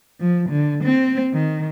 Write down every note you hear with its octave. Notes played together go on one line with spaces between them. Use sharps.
F3
D3
C4
D#3